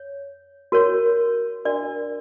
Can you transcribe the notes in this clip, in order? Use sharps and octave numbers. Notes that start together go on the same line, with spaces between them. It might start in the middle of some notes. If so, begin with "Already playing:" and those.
Already playing: C#5
F#4 A#4 C#5
D4 F#4 A#4 D5